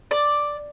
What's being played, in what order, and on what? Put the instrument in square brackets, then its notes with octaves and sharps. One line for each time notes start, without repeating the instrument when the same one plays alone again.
[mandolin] D5